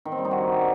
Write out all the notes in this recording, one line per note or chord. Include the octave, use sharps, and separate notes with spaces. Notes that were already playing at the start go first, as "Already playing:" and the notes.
D#3
C4
G3
D#4
F#4